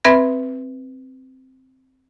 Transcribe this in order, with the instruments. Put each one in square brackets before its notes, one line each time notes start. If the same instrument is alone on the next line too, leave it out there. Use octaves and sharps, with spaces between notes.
[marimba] C4 B4 E5 B5 G#6 A#6